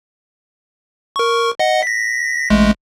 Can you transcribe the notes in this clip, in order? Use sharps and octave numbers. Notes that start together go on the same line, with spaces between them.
A#4 C#6
D#5 F#5
A#6 B6
A1 G#3 A3